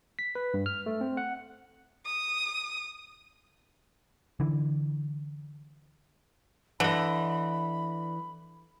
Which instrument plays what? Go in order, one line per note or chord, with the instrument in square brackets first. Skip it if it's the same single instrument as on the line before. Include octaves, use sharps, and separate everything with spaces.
[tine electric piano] B6
B4
G2
F6
A3
C4
F#5
[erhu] D#6
[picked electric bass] D3 E3
[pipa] D3 [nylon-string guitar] E3 D#5 [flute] B5